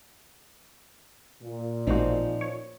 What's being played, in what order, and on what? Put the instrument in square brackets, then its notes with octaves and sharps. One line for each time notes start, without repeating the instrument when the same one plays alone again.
[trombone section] A#2
[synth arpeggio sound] A1 F#4 [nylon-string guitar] F3 C4 D#4
[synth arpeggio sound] C#5